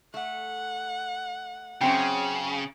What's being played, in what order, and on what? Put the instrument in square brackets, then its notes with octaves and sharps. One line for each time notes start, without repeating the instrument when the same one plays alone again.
[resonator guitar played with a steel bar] A3 [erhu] F#5
[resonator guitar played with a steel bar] F#2 C4 G5 [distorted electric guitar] C#3